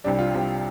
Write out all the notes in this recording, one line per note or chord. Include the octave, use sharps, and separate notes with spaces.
C2 C3 G3 D4
F4
C2 C3 G3